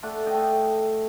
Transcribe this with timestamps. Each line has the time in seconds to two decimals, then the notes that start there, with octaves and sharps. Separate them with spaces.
0.03 A3 D5 F#5
0.26 D#5 G5
0.34 A3